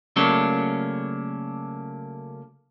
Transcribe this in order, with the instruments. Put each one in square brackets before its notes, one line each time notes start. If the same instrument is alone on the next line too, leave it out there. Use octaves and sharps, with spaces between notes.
[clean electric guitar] C#3 F#3 A3 A#3 C#4 D4